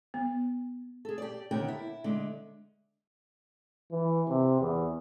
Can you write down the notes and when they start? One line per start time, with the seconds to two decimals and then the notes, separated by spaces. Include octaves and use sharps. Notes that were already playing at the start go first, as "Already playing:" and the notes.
0.14 B3
1.05 G#4 A4
1.18 G4 D5
1.51 D#2 D3 A#4 F#5 G5
1.68 E4
2.04 D3 G#3
3.92 E3
4.28 C3
4.60 E2